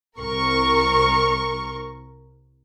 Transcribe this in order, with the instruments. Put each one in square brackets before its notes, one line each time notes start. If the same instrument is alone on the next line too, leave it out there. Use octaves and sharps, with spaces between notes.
[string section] C2 A#4 C#6